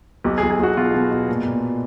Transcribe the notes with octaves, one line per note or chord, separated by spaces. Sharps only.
B1 G4
G#4
B1
G#4
B1 F#4
B2 F4
B2
B2
A#2
A#2